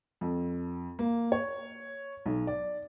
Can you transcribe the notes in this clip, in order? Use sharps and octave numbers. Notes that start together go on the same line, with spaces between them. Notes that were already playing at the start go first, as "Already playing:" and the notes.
F2
A#3
C#5
B1
D5